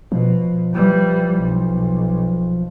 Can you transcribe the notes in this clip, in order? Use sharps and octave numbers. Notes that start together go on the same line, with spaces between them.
B2 F3
E3 G3
B1